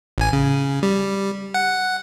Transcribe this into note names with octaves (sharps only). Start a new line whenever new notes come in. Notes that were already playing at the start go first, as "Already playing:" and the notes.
A1 G#5
C#3
G3
F#5